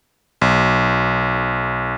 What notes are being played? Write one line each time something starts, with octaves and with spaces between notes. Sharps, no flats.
B1